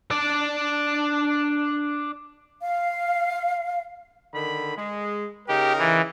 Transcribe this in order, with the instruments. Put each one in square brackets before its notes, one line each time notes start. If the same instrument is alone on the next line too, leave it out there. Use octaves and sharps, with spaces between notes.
[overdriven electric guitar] D4 D5
[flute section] F5
[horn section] D3 D#3 B5
G#3
[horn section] C#3 D#4 A#4 [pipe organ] G4
[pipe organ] E3